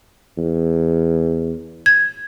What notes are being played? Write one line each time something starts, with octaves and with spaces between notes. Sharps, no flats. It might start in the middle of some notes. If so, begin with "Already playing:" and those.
E2
G#6